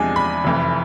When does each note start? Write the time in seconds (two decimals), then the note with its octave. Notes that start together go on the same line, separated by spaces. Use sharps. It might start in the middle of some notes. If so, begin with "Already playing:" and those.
Already playing: E2 C3 F3 G#3 D4 G#5
0.16 B5
0.44 F1 F2 E3